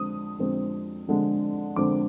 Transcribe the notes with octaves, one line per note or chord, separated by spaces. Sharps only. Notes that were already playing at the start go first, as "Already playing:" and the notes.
Already playing: F2 D3 G#3 C4 D#6
F2 D3 G#3 C4
F2 D3 G#3 C4
F2 D3 G#3 C4 D6